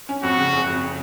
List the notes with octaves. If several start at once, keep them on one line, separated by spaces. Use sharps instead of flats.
C#4
F2 F#4
C#3
F#1
F2